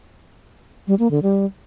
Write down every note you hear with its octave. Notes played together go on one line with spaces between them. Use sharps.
G3
A#3
D3
G3